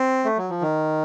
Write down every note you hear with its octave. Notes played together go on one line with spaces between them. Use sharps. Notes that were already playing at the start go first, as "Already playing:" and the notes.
Already playing: C4
A3
F#3
F3
D#3